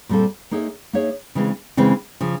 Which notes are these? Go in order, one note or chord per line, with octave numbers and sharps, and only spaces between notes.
A#2 G3 C4 F4 A4
A#3 D#4 G#4 C#5 E5
A#3 D#4 G#4 C#5 E5
C#3 E3 G#3 C4
C#3 E3 G#3 C4
C#3 F3